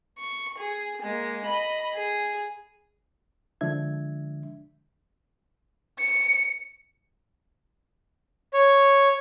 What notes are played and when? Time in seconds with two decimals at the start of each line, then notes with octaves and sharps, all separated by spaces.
0.19 C#6
0.58 G#4
1.02 G#3 A#3
1.44 D#5 B5
1.93 G#4
3.61 D3 F3 G#3 D4 E5 G#6
5.98 C#7
8.54 C#5